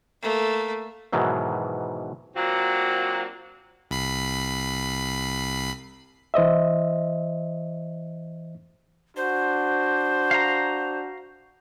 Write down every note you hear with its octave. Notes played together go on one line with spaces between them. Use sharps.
A3 A#3
G#2 B2 D#3 E3 F#3
F#3 A#3 C4 D4 F4 F#4
C2 B5 C7
E3 C5 D#5 E5
D4 F#4 C5
F5 A#5